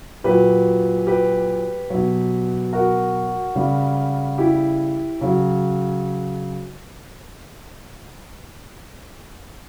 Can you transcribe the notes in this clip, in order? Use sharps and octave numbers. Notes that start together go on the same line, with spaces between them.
A#2 F#3 G4 B4
G4 B4
B2 F#3
F#4 A#4
C#3 G3
E4 G4
C#3 F#3